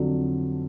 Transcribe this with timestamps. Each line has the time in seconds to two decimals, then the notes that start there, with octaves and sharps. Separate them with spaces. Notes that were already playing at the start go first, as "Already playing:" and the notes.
Already playing: F2 D3 F#3